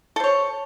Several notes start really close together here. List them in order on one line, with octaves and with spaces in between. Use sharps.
A4 C5 C#5